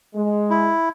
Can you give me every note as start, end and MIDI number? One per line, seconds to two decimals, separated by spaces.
0.15 0.71 56
0.50 0.89 64